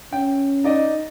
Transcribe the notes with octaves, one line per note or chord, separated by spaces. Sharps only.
C#4 G5
D#4 D5 D#5